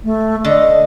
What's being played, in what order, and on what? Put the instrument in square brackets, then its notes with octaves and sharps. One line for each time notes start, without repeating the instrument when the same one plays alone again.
[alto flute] A3
[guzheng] D3 [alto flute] D#5